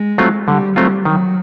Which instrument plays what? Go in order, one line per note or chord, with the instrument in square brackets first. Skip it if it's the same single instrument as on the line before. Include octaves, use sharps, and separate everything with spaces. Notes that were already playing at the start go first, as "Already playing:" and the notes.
Already playing: [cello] G#3
[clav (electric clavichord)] F#3 A3 C4 F4
[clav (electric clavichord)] D3 [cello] G3
[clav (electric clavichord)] F#3 A3 C4 F4 [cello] G3
[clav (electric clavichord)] D#3 [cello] F#3